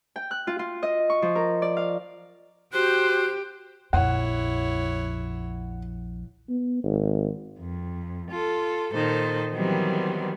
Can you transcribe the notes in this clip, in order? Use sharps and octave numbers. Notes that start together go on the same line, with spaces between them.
G5
F#6
F4
F4
D#5
C#6
F3
A#4
D5
F5
F#4 G4 C5 F#6
A#1 F2 E4 C#5 F#5
B3
G#1
F2
F4 A4
A#2 D#3 A4 C5
D#3 E3 F#3 G3 B3 C4